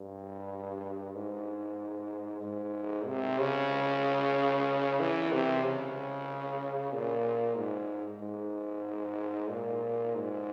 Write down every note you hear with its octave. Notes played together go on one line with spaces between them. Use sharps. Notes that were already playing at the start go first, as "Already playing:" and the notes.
Already playing: G2
G#2
G#2
C3
C#3
E3
C3
C#3
A#2
G#2
G#2
A#2
G#2